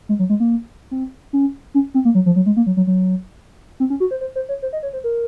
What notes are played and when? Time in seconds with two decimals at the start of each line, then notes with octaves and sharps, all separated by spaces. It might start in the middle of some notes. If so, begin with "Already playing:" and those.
0.09 G#3
0.19 F#3
0.29 G#3
0.40 A#3
0.91 C4
1.33 C#4
1.74 C#4
1.94 C4
2.05 A#3
2.15 F#3
2.26 F3
2.36 F#3
2.46 G#3
2.57 A#3
2.67 F#3
2.77 F#3
2.87 F#3
3.80 C4
3.90 C#4
4.00 F#4
4.11 C5
4.21 C5
4.36 C5
4.49 C#5
4.62 C5
4.73 D#5
4.83 C#5
4.93 C5
5.04 A#4